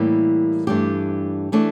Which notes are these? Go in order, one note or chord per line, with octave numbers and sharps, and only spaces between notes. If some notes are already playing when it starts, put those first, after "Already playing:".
Already playing: A2 E3 G3 A#3 G4
G2 E3 A3 D4 G4
E3 A3 D4